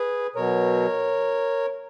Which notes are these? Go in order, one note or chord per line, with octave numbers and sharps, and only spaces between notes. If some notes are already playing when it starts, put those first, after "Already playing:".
Already playing: G#4 B4
B2 F#3 A#4 C#5